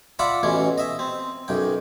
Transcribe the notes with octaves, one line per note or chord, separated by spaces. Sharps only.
F4 D5 E5 F#5 B5
A1 B2 E3 C#4
D#5 E5
C4
B1 F#2 G5